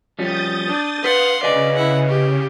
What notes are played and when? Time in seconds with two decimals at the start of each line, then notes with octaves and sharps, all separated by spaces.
0.19 F3 G3 C#4 D#6 G6 A6
0.67 D4
1.04 B4 F5 F#5 C6
1.43 C#3 B4 D5 D#5 G#5
1.75 E4 F#5
2.08 G4